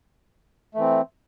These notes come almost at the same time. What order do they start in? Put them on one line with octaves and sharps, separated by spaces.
A3 E3 C4